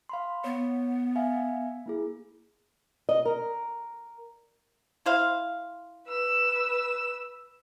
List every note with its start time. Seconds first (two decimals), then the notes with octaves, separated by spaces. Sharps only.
0.09 F5 B5 C6
0.44 B3 C#5
1.16 E5 F5 G#5
1.86 A#3 E4 G#4
3.09 D#5
3.25 A#4
5.06 E4 C5 F5
6.08 B4 E6